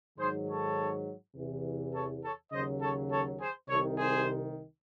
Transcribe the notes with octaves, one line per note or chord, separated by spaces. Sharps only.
G#2 D#3 F#3 G#4 C5
A4 C#5
E2 C3 E3
A4 C#5
A4 C#5
D#2 C#3 F#3 C5 D#5
A4 C#5
A4 C#5
G#4 C5
C2 C3 D#3 A4 C#5
G#4 C5